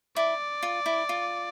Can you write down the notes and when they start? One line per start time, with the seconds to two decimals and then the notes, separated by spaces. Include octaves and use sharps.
0.16 E4 D5
0.63 F4
0.86 E4
1.09 F4